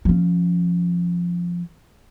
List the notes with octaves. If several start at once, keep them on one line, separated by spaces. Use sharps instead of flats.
F3 C#4